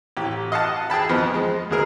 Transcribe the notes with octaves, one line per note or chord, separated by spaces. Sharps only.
A1 G4
D#5 F5 F#5 A5
G#4 G5 A5 B5
F2 F3 B3 D#4
G#3
D2 G#3 G#4 A#4